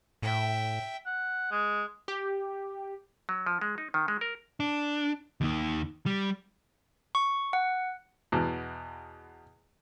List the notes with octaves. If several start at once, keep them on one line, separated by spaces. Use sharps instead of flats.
A2 E5 G5
F#5
G#3
G4
F#3
F3
G#3
D#4
D#3
G#3
A#4
D4
D#2 D#3
G3
C#6
F#5
E2 B2